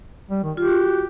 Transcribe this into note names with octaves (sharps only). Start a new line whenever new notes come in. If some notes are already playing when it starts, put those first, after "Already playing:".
G3
D#3
F4 G4
F#4